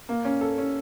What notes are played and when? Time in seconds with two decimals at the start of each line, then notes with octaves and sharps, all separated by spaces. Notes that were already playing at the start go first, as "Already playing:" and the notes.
0.09 A#3
0.25 C#4
0.41 A4
0.58 C#4